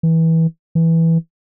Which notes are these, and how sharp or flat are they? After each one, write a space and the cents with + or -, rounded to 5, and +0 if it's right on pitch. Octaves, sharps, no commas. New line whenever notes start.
E3 -20
E3 -5